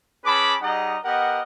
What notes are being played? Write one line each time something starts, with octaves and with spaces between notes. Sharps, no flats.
C#4 G#4 B4 A5 B5 D6
G3 D#4 G#4 D#5 F#5 A#5
B3 G4 A#4 D#5 F#5